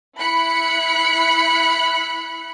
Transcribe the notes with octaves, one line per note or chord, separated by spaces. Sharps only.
E4 B5 F#6 C#7